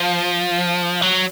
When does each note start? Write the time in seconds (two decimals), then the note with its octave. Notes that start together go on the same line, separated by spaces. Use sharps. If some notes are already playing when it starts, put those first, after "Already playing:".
Already playing: F3
1.02 F#3